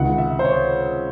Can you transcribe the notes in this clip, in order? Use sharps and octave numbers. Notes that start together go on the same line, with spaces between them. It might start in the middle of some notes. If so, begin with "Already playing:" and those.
Already playing: C#2 C3 D#3 F#5
E5
C5
C#5